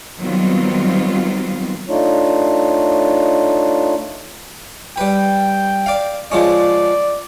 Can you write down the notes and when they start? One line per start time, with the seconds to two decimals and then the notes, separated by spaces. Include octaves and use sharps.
0.20 D#3 F#3 G3 B3 C4 F4
1.89 A3 D4 D#4 F4 C#5
4.98 G3 B4 G5
5.86 D5 F5
6.32 F3 G#3 C#4 D5